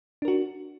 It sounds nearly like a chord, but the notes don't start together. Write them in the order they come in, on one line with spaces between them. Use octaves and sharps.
D4 A#4 F#4